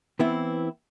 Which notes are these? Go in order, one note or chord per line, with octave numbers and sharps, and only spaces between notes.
E3 B3 C4 E4